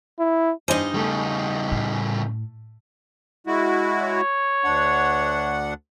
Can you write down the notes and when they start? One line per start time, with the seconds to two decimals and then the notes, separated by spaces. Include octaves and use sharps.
0.19 E4
0.68 G2 D#4 C5 D#5 G#5
0.94 C#3 G3 A3
1.72 A2
3.47 G#3 E4 F#4
4.01 C#5
4.64 D2 D4 F#5